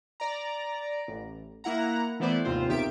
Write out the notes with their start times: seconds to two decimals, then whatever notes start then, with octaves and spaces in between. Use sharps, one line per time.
0.20 D5 A#5
1.08 A1
1.64 A#3 E4 F#5 A#5
2.20 E3 A3 B3 E4 C5 D5
2.45 D#2 G#2 C3 F4 C5
2.68 B1 D#3 G4 E5 D7